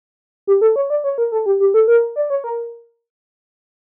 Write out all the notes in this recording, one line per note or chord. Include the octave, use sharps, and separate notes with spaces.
G4
A4
C#5
D5
C#5
A#4
A4
G4
G4
A4
A#4
D5
C#5
A#4